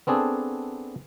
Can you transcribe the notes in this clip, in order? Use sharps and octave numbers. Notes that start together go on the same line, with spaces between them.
B3 C4 D4 G#4 A4